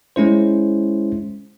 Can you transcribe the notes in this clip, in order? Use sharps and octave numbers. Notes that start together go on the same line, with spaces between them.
G#3 C#4 E4 C5